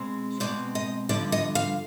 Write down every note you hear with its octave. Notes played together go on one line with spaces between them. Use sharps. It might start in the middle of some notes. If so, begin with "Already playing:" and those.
Already playing: B2 G#3 C4
B2 G#3 C4 D5
D#5
G2 D3 F3 D5
D#5
F5